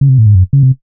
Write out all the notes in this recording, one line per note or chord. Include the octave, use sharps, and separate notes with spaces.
C#3
C3
A2
G#2
F#2
C#3
C3